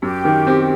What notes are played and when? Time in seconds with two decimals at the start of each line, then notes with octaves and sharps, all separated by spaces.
0.02 F#2 G4
0.25 D#3
0.47 C4